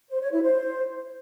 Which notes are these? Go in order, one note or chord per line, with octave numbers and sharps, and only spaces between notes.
C5
C#5
E4
C5